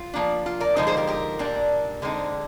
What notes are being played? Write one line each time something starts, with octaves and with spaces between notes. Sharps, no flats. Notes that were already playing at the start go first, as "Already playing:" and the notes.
Already playing: F4
F3 A#3 D4
F4
A#4 D5
D3 F3 G#3 D#4 C5 D#5
G#4 C5
G4 A#4
G4 A#4
A#2 G3 D4
D3 G#3 C4 D#4